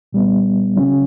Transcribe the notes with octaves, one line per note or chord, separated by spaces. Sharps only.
A#2 G3 B3
C#3 F#3 C#4